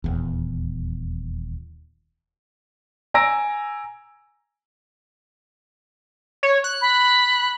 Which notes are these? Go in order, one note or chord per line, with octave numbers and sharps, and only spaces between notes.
D#1 E2
G#5 A#5 E6 A#6 D7
C#5
F#6
B5